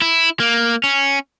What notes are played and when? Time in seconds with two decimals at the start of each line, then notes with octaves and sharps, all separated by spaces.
0.02 E4
0.40 A#3
0.84 C#4